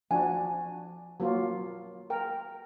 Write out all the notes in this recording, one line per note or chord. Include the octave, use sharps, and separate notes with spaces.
F3 D4 F#4 G#5
F#3 A#3 F4
A#4 G5